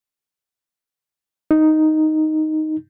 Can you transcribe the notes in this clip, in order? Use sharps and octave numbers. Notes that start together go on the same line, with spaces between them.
D#4